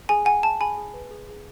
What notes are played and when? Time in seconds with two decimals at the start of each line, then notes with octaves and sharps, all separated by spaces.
0.09 G#4 G#5
0.25 F#5 G#5
0.43 F#5 A5
0.61 G#4 G#5 B5
0.77 G#4
0.94 B4
1.11 G#4
1.29 G#4